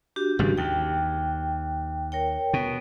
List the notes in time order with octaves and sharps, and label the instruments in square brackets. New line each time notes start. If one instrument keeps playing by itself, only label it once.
[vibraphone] D4 F#4 G4
[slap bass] G#1 C#3 G3
[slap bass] D#2 [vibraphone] G5
[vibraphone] A#4 C#5 G5
[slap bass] B2